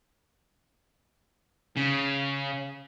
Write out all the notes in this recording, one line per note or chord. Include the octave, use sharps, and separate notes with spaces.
C#3